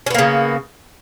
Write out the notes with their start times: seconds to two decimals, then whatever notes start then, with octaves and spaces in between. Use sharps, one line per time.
0.06 C#4
0.10 B3
0.14 A#3
0.18 C#3